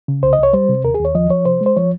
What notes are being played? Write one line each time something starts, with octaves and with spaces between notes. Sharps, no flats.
C#3
C2 C5
D#5
C2 C#5
G3 C5
C3
D#2 A#4
G#4
D#2
C#5
F3 D#5
F3 C#5
C3 C5
G#3
C5
F3 C#5